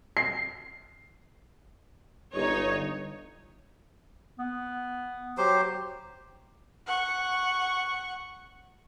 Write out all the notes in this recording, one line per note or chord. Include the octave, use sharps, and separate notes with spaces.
C7
G1 D#4 C#5
B3
F#3 G4 C5
F#5 C#6